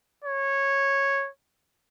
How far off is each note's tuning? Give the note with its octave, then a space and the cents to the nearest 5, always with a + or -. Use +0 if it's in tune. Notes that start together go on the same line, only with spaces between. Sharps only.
C#5 -10